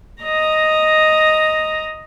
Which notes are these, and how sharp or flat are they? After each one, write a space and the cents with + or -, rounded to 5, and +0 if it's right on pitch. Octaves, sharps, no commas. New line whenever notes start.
D#5 +0 A#5 +0